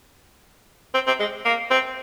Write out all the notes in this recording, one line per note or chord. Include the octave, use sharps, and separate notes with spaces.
C4
C4
G#3
A#3
C4